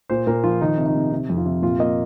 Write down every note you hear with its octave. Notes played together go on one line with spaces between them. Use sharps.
A#2 C5
A#2 A#4
F3 F4
D#3 D#4
C3
D#4
C3
C3
F2
F4
C3
A#2 F4
A#3 D#5